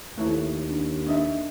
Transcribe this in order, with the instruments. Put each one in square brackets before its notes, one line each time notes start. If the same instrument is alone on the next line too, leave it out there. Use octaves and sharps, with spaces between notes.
[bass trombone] D#2 [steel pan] A3 E4 C#5
[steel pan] D4
D4 D#5 E5